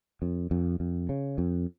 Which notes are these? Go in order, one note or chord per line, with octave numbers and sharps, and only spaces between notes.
F2
F2
F2
C#3
F2